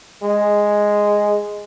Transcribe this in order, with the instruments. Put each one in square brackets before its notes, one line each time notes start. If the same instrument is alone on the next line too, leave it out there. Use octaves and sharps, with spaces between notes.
[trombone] G#3